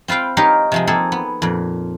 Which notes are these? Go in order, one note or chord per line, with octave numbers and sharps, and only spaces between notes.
C4 F4 B4 F5 G5
D#4 G4 A#4 C#5 F5
C3 F3 G#3
A#3 C4 G#4 A4
B3
F2 A#2